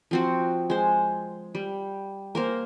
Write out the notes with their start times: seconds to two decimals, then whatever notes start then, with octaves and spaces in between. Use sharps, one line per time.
0.11 F3 C4 F#4
0.70 G#3 C5
1.55 G3
2.35 A#3 A#4 C5